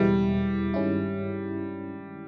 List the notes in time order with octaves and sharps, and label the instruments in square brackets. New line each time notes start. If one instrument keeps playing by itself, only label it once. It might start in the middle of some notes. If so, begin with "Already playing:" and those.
Already playing: [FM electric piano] E2 B2 G#3 B3 E4 [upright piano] G3
[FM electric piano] G2 D#3 G#3 C#4 E4